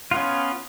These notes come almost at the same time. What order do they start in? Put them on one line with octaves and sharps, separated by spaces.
F4 B3 C#4